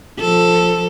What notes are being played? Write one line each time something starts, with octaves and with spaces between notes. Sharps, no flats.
F3 A4